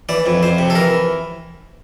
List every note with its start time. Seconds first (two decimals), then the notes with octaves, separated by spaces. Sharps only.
0.09 E3 D5
0.26 F2
0.43 F2 C5
0.59 C3
0.70 A4
0.76 E3 A#4